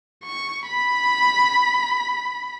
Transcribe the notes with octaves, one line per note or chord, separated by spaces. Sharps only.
C#6
B5